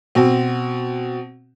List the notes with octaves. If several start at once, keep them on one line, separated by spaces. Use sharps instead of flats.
B2 C4